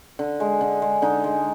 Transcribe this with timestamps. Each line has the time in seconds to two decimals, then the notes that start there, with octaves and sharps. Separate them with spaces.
0.19 D3
0.40 G#3
0.61 D3
0.82 G#3
1.02 D3 D#4
1.24 G#3